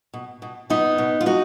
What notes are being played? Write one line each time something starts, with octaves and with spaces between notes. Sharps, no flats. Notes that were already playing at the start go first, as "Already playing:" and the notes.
B2
B2
B2 B3 D#4
B2
F4
B2 D#4 F#4